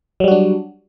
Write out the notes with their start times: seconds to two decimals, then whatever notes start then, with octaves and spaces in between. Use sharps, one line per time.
0.20 F#3
0.24 G3
0.28 F#4
0.31 D4